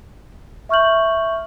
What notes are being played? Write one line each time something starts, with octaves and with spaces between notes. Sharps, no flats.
E5 C#6 F6 G6 F#7